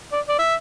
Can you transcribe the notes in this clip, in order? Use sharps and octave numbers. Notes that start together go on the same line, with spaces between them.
D5
D5
E5